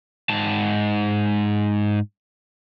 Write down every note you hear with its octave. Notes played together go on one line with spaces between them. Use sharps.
G#2 A5